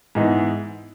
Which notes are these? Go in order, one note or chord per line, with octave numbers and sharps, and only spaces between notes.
G#2 E3 B3 D#4